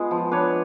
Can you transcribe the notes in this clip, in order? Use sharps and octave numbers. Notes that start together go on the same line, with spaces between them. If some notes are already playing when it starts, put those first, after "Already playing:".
Already playing: G#3 B3 F4
F3
D4 B4 C#5